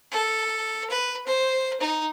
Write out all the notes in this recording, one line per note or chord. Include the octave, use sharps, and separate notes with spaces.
A4
B4
C5
D#4